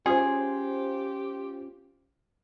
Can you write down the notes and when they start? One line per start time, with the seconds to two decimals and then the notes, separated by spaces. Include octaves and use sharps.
0.06 C#4 F4 G4 G#4 C5